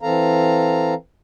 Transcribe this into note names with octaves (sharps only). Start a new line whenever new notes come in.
E3 C4 A4 F5 A#5